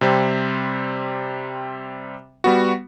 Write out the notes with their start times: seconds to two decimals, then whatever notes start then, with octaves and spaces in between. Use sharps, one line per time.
0.01 C3 G3 C4
2.44 G3 B3 F#4